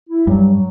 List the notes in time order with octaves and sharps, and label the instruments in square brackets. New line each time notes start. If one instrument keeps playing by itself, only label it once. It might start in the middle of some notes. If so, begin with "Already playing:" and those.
[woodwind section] E4
[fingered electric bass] G2 [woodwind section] F#3
[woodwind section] F#3